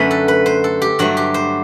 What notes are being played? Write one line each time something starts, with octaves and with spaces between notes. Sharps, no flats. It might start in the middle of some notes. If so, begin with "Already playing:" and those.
Already playing: F#2 D3 A3 B4
A4
B4
C5
A4
G4
G2 F#3 A3 F#4
G4
C5